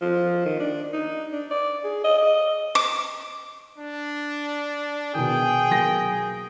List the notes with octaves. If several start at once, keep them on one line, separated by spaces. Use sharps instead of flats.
F3
D#3
D4
D#4
D4
D5
G#4
D#5
D#5
D6
D4
B2 D#3 G#4 G5
B1 A#3 A#6